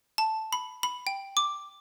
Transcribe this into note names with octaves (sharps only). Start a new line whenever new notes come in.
A5
B5
B5
G5
D6